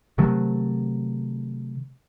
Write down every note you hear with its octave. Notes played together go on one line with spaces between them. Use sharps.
C3 D#3 F#3 A3